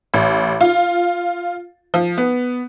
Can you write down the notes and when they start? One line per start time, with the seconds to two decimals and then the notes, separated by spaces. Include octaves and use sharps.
0.14 A1
0.61 F4
1.94 F3
2.18 B3